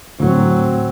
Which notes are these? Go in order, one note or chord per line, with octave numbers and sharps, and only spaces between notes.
D2 A2 F#3 C4